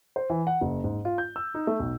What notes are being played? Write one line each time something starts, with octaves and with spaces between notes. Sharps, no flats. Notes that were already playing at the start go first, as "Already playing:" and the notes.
C5
E3
F#5
F#1
G#2
F4
G6
E6
D#4
A3
B1